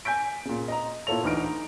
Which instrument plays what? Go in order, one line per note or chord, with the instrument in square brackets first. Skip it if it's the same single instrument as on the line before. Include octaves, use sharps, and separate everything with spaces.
[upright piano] G#5 G6 B6 D7
A#2 C#3
D#5 A#5
A#2 E4 F4 A4 C#5 F7
D2 E3 D#4 F6 D7
D#4